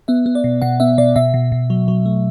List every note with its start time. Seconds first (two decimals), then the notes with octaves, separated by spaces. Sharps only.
0.08 B3 E5
0.26 B3
0.35 D5
0.44 B2
0.62 B2 F#5
0.80 B3 E5
0.98 B2 D5
1.16 B2 E5
1.34 B2
1.52 B2
1.70 F#3
1.88 F#3
2.06 A3